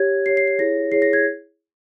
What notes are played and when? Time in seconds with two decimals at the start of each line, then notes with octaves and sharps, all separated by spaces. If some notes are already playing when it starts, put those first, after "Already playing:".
Already playing: G4 C#5 G#6
0.26 G4 C#5 C7
0.37 C7
0.48 C7
0.59 E4 G#4 C#5 A#6
0.92 E4 G#4 C#5 C7
1.02 A#6
1.13 G#6